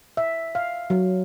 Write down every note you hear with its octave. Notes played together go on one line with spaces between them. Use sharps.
E5
F5
F#3